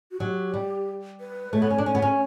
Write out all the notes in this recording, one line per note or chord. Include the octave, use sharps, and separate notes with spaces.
F#4
F#3 G4
G3
B4
A3 C#5
B3
C#4
D4
C#4 C#5
B3
C#4